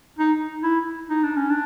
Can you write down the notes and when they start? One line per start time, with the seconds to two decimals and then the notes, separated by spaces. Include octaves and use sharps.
0.18 D#4
0.63 E4
1.10 D#4
1.24 D4
1.36 C#4
1.50 D4